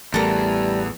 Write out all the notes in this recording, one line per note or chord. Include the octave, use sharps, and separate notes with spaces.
A1 E2 G3 A3 A4 A#4